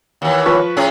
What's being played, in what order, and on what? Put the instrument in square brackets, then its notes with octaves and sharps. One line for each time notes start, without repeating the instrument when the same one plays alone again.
[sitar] D#2 E3
[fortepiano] F3 B4 C#6
[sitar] A2 C#4 G#4